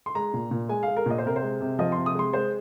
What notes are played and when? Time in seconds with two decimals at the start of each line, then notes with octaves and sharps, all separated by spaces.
0.06 C6
0.15 G#3 A#5
0.33 A#2
0.51 A#2
0.69 G#3 G#5
0.83 F5
0.88 G#3
0.97 A#4
1.06 A#2 D#5
1.18 C5
1.25 C3 A#4
1.36 C5
1.42 G#3
1.61 C3
1.79 F3 D#5
1.92 C6
1.97 C3
2.06 D#6
2.15 G#3 C6
2.33 G#3 C5